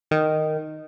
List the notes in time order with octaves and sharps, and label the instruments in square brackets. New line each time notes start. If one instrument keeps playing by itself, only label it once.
[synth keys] D#3